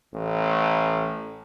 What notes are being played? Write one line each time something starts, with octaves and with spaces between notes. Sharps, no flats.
A1